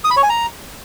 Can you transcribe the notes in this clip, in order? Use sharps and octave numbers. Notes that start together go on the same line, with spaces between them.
D#6
B5
C#5
G#5
A#5